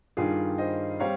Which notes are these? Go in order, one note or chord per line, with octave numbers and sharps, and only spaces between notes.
G2 D#3 G3 F4 G#4
C5 D#5
G3 C4 C#5 F5